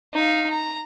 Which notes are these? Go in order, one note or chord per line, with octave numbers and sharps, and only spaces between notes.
D#4 F5
A#5